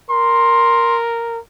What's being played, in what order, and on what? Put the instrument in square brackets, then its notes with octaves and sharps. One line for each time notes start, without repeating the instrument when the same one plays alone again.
[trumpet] A#4 [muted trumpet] C6